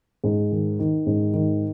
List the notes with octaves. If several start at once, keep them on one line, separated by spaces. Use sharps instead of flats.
G#2
D#3
D#3
G#2
D#3